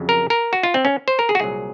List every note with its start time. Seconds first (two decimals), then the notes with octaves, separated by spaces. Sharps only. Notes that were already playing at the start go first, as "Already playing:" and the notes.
Already playing: F2 C#3 F#3
0.09 A#4
0.30 A#4
0.53 F#4
0.63 F4
0.74 C4
0.85 C#4
1.08 C5
1.19 A#4
1.29 G#4
1.35 F#4
1.40 C2 A#2 F#3 G#4